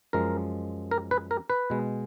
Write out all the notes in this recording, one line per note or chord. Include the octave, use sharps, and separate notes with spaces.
F#2 F3 G#3 A#4
A#4
B4
A#4
B4
B2 G#3